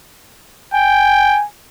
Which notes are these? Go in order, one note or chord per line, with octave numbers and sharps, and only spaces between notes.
G5 G#5